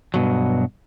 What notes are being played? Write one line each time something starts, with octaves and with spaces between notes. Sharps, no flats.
G2 B2 F#3